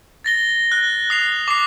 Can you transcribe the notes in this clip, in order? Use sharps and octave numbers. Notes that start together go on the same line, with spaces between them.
A6 A#6 G7
F#6
D#6 C7 F7
D6 A#6 C7